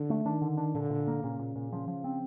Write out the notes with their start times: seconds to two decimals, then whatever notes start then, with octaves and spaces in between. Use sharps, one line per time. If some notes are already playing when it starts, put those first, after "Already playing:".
Already playing: D3
0.10 A3
0.25 D#3 D4
0.42 D3
0.57 D4
0.74 A#2 D3
0.90 A#2
1.07 A#3
1.23 A#2 C#3
1.39 A#2
1.55 A#2
1.72 C#3 F3
1.88 F3
2.04 C4